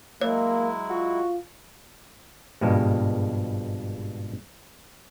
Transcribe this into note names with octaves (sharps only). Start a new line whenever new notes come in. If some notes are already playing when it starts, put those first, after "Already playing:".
F#3 G#3 A#3 E4 C#5
F4 F#4
G#1 G2 B2 F3 G3 G#3